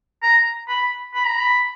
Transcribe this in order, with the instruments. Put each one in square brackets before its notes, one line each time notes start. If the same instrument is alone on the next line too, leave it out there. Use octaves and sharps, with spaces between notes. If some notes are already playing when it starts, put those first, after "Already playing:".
[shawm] A#5
B5
B5
A#5
B5